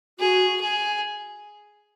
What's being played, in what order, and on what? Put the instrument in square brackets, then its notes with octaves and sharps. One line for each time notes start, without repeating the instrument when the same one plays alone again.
[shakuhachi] F#4 [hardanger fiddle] G#4
[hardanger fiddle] G#4